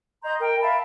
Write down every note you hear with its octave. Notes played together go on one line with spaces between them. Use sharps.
D#5 A#5 C6 G6
A#4 G5
E5 F5 A5 B5